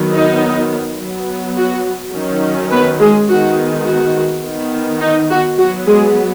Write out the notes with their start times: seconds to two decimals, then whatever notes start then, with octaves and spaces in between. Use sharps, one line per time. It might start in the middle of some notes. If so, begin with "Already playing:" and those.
Already playing: D#3 F#3 B3
0.13 D#4
0.99 F#3 B3
1.57 F#4
2.14 D#3 F#3 C#4
2.72 B3 B4
3.00 G#3 G#4
3.29 D#3 G#3 B3 F#4
3.87 F#4
4.44 D#3 B3
5.01 D#4
5.31 F#4
5.58 F#3 F#4
5.63 B3
5.87 G#3 G#4